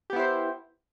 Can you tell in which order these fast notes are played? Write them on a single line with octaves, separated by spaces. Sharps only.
G4 B3 E4 C5